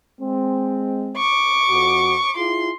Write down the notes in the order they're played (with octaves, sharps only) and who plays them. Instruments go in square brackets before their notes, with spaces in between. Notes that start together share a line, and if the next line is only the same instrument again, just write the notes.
[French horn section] G#3 C4
[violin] C#6 D6
[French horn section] F2 F#4
[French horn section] E4 F4 G#4 [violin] C6